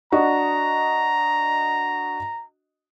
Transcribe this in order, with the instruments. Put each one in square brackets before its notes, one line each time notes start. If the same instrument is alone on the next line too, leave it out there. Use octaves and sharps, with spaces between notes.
[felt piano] D4 F#4 D#5 [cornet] A#5